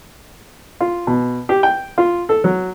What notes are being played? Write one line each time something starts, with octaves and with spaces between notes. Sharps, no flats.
F4
B2
G4
G5
F4
A4
F#3